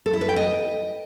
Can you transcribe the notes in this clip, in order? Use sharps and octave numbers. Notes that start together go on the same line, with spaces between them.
A4
E4
B4
G5
D#5